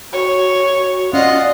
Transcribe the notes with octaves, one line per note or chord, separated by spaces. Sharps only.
F#4 C#5
F#4
C#4 F4 D5 D#5 F#5